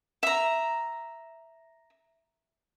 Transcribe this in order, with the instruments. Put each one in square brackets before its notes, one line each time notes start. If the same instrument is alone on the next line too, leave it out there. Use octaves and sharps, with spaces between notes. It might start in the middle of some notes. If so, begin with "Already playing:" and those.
[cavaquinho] E5 A#5